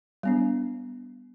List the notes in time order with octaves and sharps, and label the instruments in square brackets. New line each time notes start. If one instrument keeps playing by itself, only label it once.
[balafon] G3 B3 D4